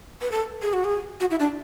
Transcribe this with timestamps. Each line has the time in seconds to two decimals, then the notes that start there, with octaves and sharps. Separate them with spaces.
0.22 B4
0.32 A4
0.62 G#4
0.73 F#4
0.84 G#4
1.20 F#4
1.31 E4
1.40 D4